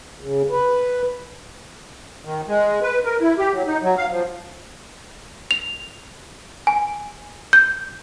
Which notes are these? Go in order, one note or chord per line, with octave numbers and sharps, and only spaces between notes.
C#3
B4
D#3
G#3
B4
A#4
E4
G4
F#3
D#4
F#3
F5
F3
F7
G#5
G6